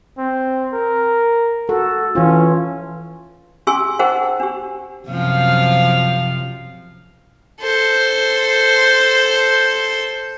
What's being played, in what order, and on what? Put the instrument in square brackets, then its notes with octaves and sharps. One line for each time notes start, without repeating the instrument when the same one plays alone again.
[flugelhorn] C4
A#4
[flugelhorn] F#4 [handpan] A4
[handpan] E3 F4 [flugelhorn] C#4
[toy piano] C#4 G4 G#4 G#5 C6 E6
D#4 G#4 A#4 C5 F#5 G5
D4 G4
[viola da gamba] F#2 C3 F3 [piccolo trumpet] F5
[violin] A4 C5